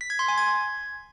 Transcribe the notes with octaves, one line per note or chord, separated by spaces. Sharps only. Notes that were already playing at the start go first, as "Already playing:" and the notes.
B6
G#6
C6
G#5
G#6